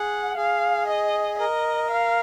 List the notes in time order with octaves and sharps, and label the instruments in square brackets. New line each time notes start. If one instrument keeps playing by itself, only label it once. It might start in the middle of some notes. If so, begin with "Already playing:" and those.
Already playing: [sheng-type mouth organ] G#4 [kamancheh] F#5
[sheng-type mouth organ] G#4 [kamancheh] F5
[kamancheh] D#5
[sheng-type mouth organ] A#4 [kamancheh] D#5
[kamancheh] F5